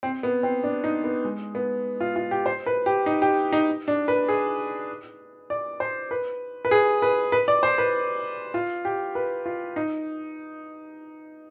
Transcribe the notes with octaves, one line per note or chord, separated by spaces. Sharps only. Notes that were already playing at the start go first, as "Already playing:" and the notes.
C4
B3
C4
D4
D#4
B3
G#3
B3
F4
F4
G4
C5
B4
G4
D#4
G4
D#4
D4
B4
G#4
D5
C5
B4
B4
G#4
B4
B4
D5
C5
B4
F4
G4
B4
F4
D#4